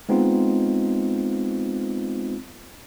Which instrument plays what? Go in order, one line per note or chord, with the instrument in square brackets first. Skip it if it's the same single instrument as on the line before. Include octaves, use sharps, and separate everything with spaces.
[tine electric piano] G#3 B3 C4 D#4 F4